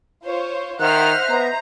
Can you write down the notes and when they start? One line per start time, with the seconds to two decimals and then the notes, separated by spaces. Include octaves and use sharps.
0.24 F4 C5 C#5
0.79 D#3 C5 D#5 E5 F#5 F6 F#6
1.29 B3 A#5